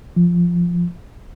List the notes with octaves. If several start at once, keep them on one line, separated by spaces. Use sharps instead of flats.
F3